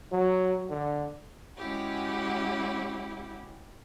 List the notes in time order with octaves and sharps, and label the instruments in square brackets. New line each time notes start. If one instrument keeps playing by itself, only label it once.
[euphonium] F#3
D3
[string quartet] G#3 C#4 E4 F#4 G4